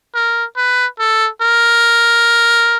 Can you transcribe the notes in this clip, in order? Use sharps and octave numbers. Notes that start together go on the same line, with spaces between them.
A#4
B4
A4
A#4